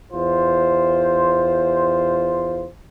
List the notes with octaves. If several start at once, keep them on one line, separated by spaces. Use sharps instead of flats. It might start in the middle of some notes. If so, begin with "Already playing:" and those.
E2 F4 C5